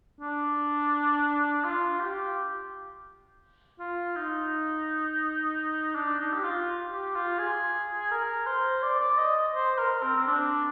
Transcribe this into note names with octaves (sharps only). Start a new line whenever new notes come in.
D4
F4
G4
F4
D#4
D4
D#4
G4
F4
G4
F4
G#4
A#4
C5
D5
D5
D#5
C5
A#4
C4
C4
D4